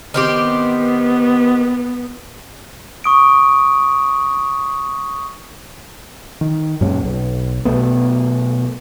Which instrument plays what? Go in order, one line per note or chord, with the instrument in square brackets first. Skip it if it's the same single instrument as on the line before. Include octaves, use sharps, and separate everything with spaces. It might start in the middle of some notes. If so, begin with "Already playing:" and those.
[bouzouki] D#3 C4 G4 [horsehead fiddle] B3
[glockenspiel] C#6 D#6 D7
[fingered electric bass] D#3
F#2 A#2 G#3 C#4
B1
B2 F#3 A3 B3